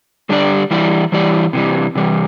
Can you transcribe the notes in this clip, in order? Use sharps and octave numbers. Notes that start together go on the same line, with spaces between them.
D3 G3 D4 G4 D5
E3 G3 E4 G4 D5
E3 G3 E4 G4 D5
C3 E3 G3
C3 E3 G3